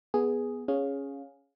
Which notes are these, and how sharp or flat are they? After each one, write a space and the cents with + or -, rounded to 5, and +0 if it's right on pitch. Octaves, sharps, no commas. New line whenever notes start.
B3 -5 G#4 +0
C#4 +0 G#4 +0 F5 +15